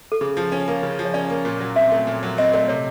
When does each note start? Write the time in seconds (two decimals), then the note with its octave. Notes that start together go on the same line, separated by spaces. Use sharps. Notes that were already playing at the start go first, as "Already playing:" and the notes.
0.12 A4
0.21 C#3 G#4
0.37 F3
0.52 C#4
0.68 A#3
0.83 C#3
0.99 F3
1.05 C#5
1.14 C#4 D5
1.30 A#3
1.45 A#2
1.60 F#3
1.76 C4 E5
1.92 A3
2.07 A#2
2.23 F#3
2.38 C4 D#5
2.50 D#5
2.53 A3 D5
2.68 C3 C#5